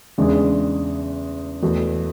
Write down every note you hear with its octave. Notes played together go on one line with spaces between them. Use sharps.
E2 C#3 G#3 D4 G#4
E2 B2 A3